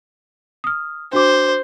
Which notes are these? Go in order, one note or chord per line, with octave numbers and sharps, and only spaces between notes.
D#6 F6
D4 F#4 C5 D6